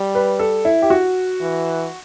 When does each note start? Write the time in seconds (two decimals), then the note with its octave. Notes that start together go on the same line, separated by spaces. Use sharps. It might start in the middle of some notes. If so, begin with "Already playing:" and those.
Already playing: G3
0.15 B4
0.39 A4
0.65 E4
0.82 G4
0.90 F#4
1.41 E3